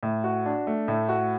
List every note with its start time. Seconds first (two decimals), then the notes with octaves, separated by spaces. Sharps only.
0.03 A2
0.24 F#4
0.46 D4
0.67 A3
0.88 A2
1.09 F#4